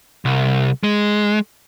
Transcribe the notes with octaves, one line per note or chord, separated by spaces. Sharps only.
C2
G#3